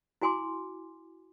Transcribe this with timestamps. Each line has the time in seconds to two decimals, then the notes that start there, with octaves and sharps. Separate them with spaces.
0.21 E4 F#4 G#5 C6 D6